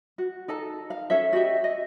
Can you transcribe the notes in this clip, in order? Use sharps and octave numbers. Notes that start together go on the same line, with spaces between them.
F#4
D#4 A4 A5
F5
C#4 A4 C#5 E5
F#4 G4 D#5 E5
D#5